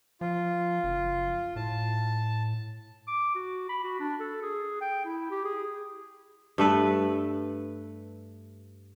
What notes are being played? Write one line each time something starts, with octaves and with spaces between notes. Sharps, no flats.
F3 F4
F#1
A2 A5
D6
F#4
B5
F#4
D4
A4
G#4
G5
E4
G4
G#4
G2 A3 B4